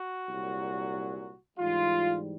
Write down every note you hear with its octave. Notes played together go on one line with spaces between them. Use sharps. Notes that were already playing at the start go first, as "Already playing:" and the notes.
Already playing: F#4
C2 A#2 F#3
G#2 E3 G3 F4